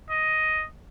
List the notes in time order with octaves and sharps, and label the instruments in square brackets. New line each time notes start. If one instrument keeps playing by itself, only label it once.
[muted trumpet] D#5